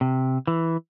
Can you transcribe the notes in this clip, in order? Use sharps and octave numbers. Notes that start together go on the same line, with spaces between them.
C3
E3